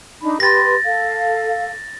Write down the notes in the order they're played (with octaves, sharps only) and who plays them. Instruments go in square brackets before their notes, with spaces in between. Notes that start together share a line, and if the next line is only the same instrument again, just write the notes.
[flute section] D4 D#4 B5
[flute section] G4 B4 C6 [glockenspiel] A6 A#6
[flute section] A4 F5